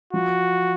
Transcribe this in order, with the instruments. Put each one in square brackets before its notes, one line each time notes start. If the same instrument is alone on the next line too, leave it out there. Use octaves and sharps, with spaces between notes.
[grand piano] F3 [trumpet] F#4